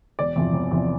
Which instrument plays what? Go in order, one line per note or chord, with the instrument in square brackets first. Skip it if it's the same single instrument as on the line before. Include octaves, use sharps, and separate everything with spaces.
[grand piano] E1 D5
E2 C3 F3
E1
E2 C3 F3